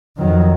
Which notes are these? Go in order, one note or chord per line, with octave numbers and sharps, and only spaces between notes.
F2 D#3 F#3